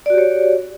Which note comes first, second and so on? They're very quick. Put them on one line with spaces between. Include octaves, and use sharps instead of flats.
D5 F#4 G4 C#5